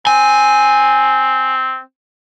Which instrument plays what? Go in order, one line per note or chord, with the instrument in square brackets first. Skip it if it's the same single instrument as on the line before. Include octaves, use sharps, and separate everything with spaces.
[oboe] C4 [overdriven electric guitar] G#5